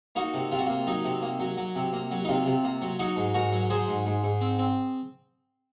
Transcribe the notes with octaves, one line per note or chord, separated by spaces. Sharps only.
A#3 D#4 F#4
C3
C3 F4
F#4
A#3 F4
F#3 D#4
C3
A#3
F#3
F#3
C3
A#3
F#3
D#4
C3 F4
C3
A#3
F#3
F#3 D#4 F#4
G#2
G#2 F#4 A#4
F#3
F#3 G#4 C5
G#2
G#2
G#2
C4
C4